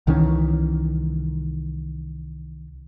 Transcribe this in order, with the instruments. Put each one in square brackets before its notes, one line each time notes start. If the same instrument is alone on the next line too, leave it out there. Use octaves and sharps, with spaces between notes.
[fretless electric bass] C2 D#3 E3 C#4